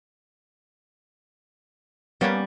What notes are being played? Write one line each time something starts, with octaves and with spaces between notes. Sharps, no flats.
G3 A#3 B3 C#4